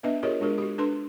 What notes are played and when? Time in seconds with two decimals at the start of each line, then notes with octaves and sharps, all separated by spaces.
0.03 B3 D4 B4 D#5 E5
0.23 F4 G4 G#4 A#4 C#5 D#5
0.40 G#3 D4 F#4 G#4 A#4
0.58 F#4 G4
0.78 D4 A4 B4 C6